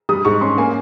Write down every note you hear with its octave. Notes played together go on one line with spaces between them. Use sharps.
G3 D#6
G#2 C#6
C#4 C6
A#3 G#5